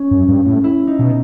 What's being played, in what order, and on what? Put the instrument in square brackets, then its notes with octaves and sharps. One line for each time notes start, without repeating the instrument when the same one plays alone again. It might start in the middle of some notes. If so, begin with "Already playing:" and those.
Already playing: [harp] C#4
[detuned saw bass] F#2
G2
A2
[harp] E4
D#4
[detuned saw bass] B2